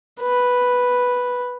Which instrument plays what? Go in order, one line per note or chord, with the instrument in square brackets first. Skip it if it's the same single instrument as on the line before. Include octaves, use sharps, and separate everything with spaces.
[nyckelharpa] B4